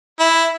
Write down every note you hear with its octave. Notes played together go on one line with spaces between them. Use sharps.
E4